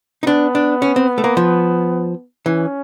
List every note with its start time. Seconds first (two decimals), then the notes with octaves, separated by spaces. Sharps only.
0.23 D#4
0.27 B3 D4
0.55 D4
0.82 C#4
0.96 C4
1.18 A3
1.24 A#3
1.37 F3
2.46 E3 C#4